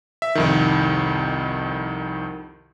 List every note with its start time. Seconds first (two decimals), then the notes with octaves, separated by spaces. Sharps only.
0.22 E5
0.35 C2 F2 D#3